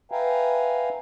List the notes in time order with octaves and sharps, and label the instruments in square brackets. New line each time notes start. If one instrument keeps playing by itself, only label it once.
[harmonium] B4 E5 F5 G5 G#5 A#5